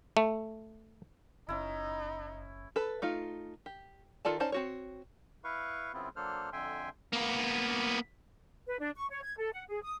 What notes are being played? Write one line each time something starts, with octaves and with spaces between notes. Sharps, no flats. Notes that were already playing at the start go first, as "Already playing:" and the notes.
A3
F#1 C#4 D#4 E4
A4 B4
A3 D#4 F4
G4
D#3 F4 A4 D5 A5
C#4 D#4 C5 D5 A5
C4 F#4 C#5
E4 B4 F5 C#6
F#2 C#3 B3 C4 E4 F4
F#3 A#3 D4 A4 C5 F6
F2 D3 E5 G5 G#5 C6
A#3 B3
B4
D4
C#6
C#5
G#6
A4
F#5
G#4
D#6